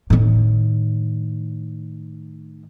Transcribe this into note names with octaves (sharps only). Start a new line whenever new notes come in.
A2 D#3